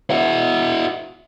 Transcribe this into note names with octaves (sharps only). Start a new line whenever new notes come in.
E4 F#4